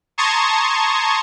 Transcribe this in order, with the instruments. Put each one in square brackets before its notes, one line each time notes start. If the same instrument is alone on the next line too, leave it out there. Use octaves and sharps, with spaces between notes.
[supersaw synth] A5 A#5 C6 C#6 D#6 G#6